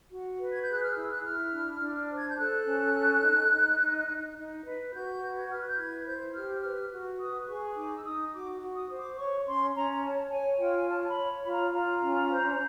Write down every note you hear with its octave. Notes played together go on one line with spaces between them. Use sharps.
F#4
B4
G#6
G#4 G6
F#6
F6
E4 E6
F#6
E4 F6
D4
D4
C5
G#6
G6
A4 F#6
C#4
A4
D#4
D#4
D#4
D#4
D#4
B4
F#4 G6
B4
G#6
B4 F6
F#6
G6
E4 G#6
C5 G6
G4 F6
B4 F6
F#4
B4 D#6
G#4 C#6
D#4 D6
E6
D#4 D#6
F#4 D6
F#4
D#6
C5
D6
C#5 C#6
C#4 C6
C#4 A#5
A#5
C#5 A5
C#5 G#5
F4 G5
G#5
C#5 A5
B5
C#5
F4 B5
A#5
F4 A#5
C#4
C5